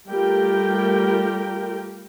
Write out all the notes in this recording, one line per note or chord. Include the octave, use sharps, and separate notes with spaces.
G3 A3 F4 G4 A#4 G5